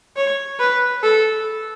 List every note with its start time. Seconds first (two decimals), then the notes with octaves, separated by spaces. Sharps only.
0.16 C#5
0.59 B4
1.03 A4